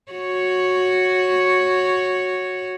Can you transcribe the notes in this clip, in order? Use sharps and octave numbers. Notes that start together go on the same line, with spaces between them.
F#4 C#5